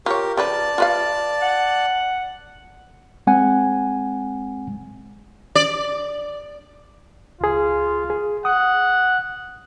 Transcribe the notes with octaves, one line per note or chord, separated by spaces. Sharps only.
F4 G4 A#4 C#5
C#3 F3 B4 D5 A5
F4 B4 F5
F#5
G#3 C4 F#5 G#5
D5
C#2 F4 G#4
G#4
F#5 D#6